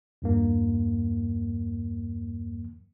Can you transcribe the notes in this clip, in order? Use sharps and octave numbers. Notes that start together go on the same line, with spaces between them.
E2 G2 A#3